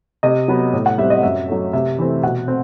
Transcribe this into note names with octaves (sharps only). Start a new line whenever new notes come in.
C3 D#5
F#3 B3
A2
F#5
G3 C4 E5
D#5
F#2 E5
F#3 A3
C3 E5
E3 A3 C4
B2 F#5
C4